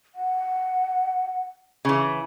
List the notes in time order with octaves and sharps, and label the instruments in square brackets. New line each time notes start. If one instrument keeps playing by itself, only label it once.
[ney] F#5
[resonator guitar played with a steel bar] C#3 E3